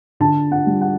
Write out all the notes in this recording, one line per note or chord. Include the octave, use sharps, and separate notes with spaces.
D3 A5
F#5
G3
F#5